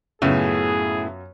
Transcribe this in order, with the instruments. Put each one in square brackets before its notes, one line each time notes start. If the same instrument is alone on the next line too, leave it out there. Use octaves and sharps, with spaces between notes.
[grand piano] F#2 F4 F7 [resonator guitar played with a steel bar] A2 C#3 [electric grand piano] B3 E5 [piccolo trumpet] G#4